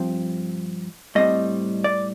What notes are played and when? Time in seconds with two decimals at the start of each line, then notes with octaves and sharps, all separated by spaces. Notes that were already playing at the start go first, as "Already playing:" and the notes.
Already playing: G2 F3 C4
1.15 A2 G3 C4 D#5
1.84 D5